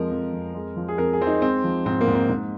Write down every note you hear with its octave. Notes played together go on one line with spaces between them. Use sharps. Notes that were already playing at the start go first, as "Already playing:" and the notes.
Already playing: F2 F3 G#3 A#4
F2
F2
G#3
F3
G#4
F2 A#4
G#4
F2 C4
D#4
G#3 C4
F3
G#2 C4
A#3
G#2
C4
G#2